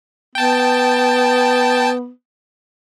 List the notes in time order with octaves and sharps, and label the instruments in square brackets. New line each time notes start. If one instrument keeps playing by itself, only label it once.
[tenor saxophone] B3 [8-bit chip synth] G5 A5